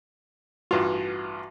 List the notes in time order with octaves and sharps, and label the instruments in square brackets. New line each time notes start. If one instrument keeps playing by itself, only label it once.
[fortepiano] A1 G2 F4 [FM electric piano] F#4